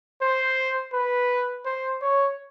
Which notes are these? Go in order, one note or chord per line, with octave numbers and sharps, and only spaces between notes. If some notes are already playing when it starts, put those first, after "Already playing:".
C5
B4
C5
C#5